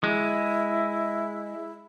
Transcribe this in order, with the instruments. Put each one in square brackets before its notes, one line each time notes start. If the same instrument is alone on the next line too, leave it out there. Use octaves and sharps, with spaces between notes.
[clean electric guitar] G#3 [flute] E4